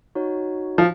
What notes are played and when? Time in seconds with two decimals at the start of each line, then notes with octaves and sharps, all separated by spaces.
0.15 D#4 F#4 C#5
0.78 F3